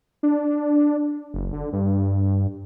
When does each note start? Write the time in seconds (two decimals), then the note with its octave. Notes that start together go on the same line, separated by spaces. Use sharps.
0.23 D4
1.34 F#1
1.53 D3
1.73 G2